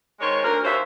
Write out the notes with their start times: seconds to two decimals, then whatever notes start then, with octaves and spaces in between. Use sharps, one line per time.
0.20 D#3 G#3 C5 C#5
0.43 D2 A#4
0.64 D#2 C#4 F4 C5 E5